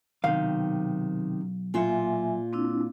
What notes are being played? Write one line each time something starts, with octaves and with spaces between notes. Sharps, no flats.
B1 C3 D#3 F5
A#2 A#3 F4 E5 G#5
C4 D4 E4